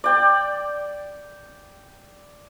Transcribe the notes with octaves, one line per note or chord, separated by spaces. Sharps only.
D5 G5